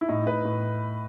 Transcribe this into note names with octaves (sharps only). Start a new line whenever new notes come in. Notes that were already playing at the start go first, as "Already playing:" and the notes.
E4
A2 D#4
A2 B4
A2